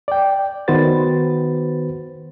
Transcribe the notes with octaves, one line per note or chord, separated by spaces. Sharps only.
D5 G5
D#3 B3 F#4 B4 C5 A6